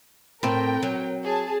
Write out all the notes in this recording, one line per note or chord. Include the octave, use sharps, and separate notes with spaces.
A2 C4 A#4 G5
F#3
G#4 A5